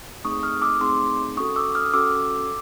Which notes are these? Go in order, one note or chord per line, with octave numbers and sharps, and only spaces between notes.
A3 C4 D#4 G#4 C#6 D#6
D#6 F6
D6 E6
A3 C4 D#4 G#4 C6 D6
C#4 F#4 A4 C#6 D#6
D6 E6
D#6 F6
C#4 F#4 A4 D6 E6